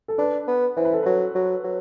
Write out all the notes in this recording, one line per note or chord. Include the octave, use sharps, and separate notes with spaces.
A4
D4 B4
B3
E3 C5
B4
A4
F#3 B4
F#3
F#3